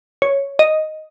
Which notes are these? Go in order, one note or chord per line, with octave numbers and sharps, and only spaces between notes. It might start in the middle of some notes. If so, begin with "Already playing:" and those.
C#5
D#5